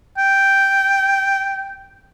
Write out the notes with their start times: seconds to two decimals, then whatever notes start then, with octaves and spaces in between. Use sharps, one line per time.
0.18 G5